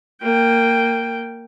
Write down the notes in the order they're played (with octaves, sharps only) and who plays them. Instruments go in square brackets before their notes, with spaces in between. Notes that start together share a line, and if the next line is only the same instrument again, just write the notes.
[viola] A#3 G5